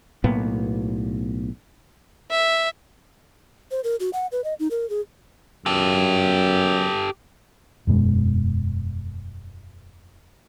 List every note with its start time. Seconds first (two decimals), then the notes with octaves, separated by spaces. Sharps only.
0.24 B1 A2 A#3 B3
2.31 E5
3.71 C5
3.84 A#4
4.00 F#4
4.13 F#5
4.32 B4
4.44 D#5
4.60 D#4
4.71 A#4
4.90 G#4
5.66 F#2 G4 A4
7.87 E1 F#2 B2 G#3